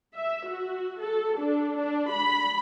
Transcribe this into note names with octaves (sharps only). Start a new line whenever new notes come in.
E5
F#4
A4
D4
D4
B5